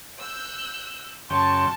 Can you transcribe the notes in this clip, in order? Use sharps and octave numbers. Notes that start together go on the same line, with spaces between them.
E6 F#6 G6
F#2 C#3 G5 A5 C6 C#6